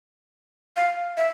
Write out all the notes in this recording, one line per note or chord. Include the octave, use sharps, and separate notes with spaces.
F5
E5